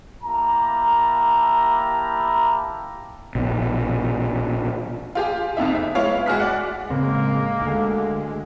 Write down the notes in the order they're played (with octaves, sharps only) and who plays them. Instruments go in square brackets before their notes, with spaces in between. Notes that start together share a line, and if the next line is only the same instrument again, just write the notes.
[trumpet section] A#3 E4 G4 A5 A#5
[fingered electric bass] A#1 B2
[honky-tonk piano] F4 G4 G#4
C2 F2 D#4 E5
E5
G#3 B3 E4 F4 C#5 F5
G#3 F#4 G#4 F6 B6
D5 F#5
[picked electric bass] A2 C#3 C4 [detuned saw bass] G#3 [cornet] A#3
[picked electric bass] D2 [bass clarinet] D3